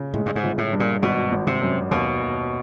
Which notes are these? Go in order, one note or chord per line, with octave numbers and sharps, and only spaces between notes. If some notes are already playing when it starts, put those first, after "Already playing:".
Already playing: C#3
A2 G#3
G2
G#2
G1
A2
G2
A#2
G#1 B2
G#1
C3
F#2
D#2 B2
D#2